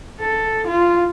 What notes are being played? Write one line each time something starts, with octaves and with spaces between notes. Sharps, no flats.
A4
F4